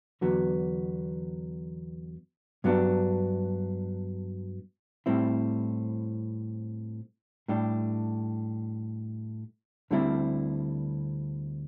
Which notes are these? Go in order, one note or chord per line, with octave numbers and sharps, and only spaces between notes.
E2 D3 F#3 B3 F#4
G2 F#3 B3 D4
A2 G3 C4 E4
A2 G3 D4 G4
D2 D3 G3 C4 E4